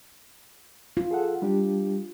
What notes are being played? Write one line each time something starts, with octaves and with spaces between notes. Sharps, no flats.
F4
G#4 A4 F#5
G3 D4 G4